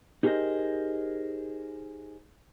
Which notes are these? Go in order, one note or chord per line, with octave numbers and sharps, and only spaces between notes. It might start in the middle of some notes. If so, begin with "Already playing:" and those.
D#4 G4 G#4 A#4 C5 D#5